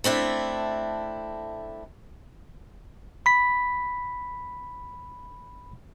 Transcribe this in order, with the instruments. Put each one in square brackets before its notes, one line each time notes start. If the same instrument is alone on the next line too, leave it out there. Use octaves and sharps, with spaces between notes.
[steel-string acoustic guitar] A3 C4 D4 E4
[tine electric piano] B5 B6